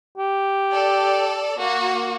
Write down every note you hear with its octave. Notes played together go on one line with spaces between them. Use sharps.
G4
A4 D5
A#3 F#4